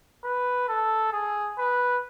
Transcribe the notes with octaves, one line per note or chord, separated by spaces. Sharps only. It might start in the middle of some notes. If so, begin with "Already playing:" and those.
B4
A4
G#4
B4